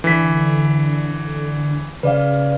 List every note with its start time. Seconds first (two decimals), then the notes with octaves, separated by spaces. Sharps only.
0.04 D3 E3 B6
2.03 C#3 B4 D5 F5